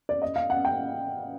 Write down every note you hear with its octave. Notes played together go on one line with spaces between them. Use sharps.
D5
D#5
F5
F#5
G5